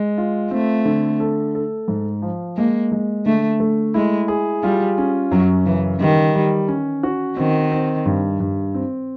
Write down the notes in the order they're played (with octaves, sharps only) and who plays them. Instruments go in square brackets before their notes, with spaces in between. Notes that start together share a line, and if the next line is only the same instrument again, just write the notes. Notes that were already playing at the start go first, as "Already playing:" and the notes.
Already playing: [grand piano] G#3
F4
[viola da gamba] A3 [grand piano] C4
[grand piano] D3
A4
A4
G#2
F3
[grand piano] G#3 [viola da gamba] A#3
[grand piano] G#3
[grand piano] D3 [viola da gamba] A3
[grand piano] A3
[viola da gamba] G#3 [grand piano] E4
[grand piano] G#4
[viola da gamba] G3 [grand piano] F4
[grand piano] C#4
[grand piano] F#2 [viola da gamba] F#3
[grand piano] C#3 [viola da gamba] E3
[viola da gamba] D#3 [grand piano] G3
[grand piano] G3
C#4
F#4
[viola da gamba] D#3 [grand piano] C4
[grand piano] C4
G2
G2
C4